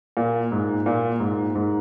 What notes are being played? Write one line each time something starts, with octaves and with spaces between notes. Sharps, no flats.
A#2
G#2
A#2
G#2
G#2